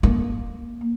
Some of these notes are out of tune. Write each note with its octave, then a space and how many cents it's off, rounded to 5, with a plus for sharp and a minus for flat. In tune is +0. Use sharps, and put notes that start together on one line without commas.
A#3 +20